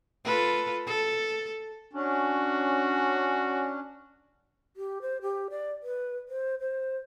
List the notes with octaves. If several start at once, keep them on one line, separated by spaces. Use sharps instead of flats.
F4 A4 B4
A4
C#4 D4 F#4
G4
C5
G4
D5
B4
C5
C5